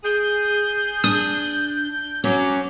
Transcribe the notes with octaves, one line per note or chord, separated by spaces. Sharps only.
G#4 G6
D4 D#6
F#3 C#4 D6